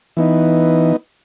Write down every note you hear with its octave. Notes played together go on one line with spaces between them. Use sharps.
E3 B3 D#4